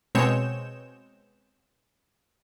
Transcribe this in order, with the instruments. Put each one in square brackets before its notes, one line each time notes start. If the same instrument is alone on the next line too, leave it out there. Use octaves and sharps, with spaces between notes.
[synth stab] B2 G#3 C4 C#5 G6 E7